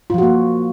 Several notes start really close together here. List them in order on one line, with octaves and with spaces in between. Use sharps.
F4 F3 F#4 A#3